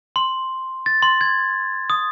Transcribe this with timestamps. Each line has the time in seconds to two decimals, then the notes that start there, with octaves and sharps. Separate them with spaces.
0.16 C6
0.86 A6
1.03 C6
1.21 G#6
1.90 D#6